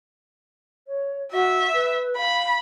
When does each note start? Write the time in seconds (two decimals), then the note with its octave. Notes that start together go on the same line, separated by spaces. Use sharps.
0.87 C#5
1.32 F#4 E5
1.73 B4
2.17 F5 B5